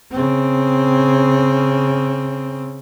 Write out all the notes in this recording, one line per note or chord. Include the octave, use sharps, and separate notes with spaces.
C#3 C4